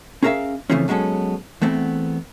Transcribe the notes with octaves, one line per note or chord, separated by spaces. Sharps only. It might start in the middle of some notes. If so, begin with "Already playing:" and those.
C#4 G#4 A#4 B4 E5 F5
C#3 E3 F3 A3 C4 C#4
F#3 G#3 B3 C#4 A4
E2 A3 B3 C4